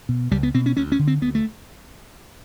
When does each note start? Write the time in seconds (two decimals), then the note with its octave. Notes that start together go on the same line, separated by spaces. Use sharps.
0.09 B2
0.31 C#2 G3
0.43 B3
0.54 B2 C4
0.66 C#4
0.77 D2 C#4
0.92 C#4
0.99 D3
1.07 C4
1.22 D2 B3
1.35 A3